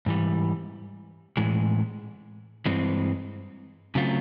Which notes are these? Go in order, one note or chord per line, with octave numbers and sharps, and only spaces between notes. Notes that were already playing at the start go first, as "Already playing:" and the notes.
G#2 E3 G3
A2 E3 G#3
G2 E3 G#3 C4
C#3 F#3 A3 C4 F4